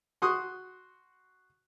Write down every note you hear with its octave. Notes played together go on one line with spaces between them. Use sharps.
F#4 C6 C#6 D#6 F#6